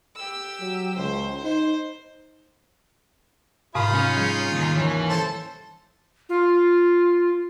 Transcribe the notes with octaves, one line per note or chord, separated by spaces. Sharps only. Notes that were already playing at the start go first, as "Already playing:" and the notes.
G4 E6
F#3
C#2 C5
D#4 C5
G#2 C3 D#4 F4 F5 B5 D#6
C#4
F3 G3 G#4
D#2
D#2 E3 C#4
A4 C5 A5
F4